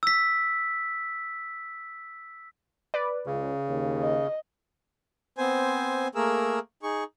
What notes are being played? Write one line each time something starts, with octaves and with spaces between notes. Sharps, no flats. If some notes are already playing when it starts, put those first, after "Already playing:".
E6 B6
B4 D5
C#2 C#3
D#2
D#5
B3 C4 C5 G#5
A3 A#3 G#4 A#4 E6
D#4 G#4 C#6